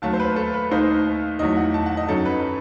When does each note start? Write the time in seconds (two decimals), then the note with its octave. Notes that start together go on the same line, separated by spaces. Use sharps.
0.02 D#2 D#3 F#3 A3 A5
0.13 C5
0.20 B4
0.36 A4
0.54 B4
0.71 D#2 D#3 A3 D#4 C5
1.39 E2 D#3 F#3 A3 D#5
1.57 F#5
1.74 A5
1.86 F#5
1.97 D#5
2.09 F#2 D#3 F#3 A4
2.26 B4